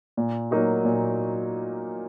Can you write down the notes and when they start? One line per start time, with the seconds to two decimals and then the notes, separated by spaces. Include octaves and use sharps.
0.17 A#2
0.51 F#3 A#3 D#4 F#4
0.85 A#2